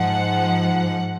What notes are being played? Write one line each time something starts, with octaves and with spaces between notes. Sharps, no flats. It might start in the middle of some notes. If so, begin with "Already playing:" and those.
Already playing: G#2 F3 F#5